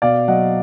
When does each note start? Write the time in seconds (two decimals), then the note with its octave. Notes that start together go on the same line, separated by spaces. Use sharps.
0.02 B2 D5 F5
0.28 F#3 D#5 F#5